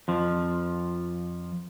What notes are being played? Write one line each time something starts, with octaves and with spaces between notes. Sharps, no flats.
F2 F3